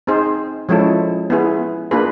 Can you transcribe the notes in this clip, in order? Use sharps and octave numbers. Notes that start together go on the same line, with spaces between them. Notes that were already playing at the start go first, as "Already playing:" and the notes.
C4 D#4 G#4 C5
F3 G#3 C#4 E4 A4
B3 E4 G#4
A#3 D4 F4 G#4 B4